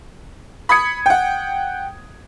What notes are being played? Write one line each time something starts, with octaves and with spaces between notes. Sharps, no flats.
B5 D#6 G#6 C#7
F#5 G5